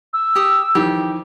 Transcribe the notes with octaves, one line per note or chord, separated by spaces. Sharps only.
E6
G4 D#6
F2 D#3 E3 G4